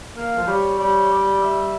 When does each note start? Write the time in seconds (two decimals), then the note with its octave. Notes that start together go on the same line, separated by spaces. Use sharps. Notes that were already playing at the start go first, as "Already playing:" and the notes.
0.17 A#3 F5
0.38 F3
0.47 G3 C#5
0.79 G3 C#5
1.10 D5
1.41 E5